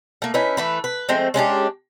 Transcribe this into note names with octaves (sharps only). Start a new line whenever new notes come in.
A3 A#3
C#4 D#4 E4 B4
E3 A3 B4
B4
F3 G#3 A3 C4
G#3 C#4 D4 G4